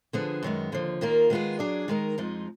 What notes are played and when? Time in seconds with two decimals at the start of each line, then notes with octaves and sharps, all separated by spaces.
0.13 D3 F3 B3 D4 G#4
0.43 F#2 D#3 G#3 B3
0.72 D#2 D3 F3
1.01 D#2 D#3 A#3 F4 A#4
1.30 D#3 G#3 B3 F4 G#4
1.59 F#3 D4 G#4 D5
1.88 D#3 G#3 D#4 A#4
2.18 F2 F3 G#3 D#4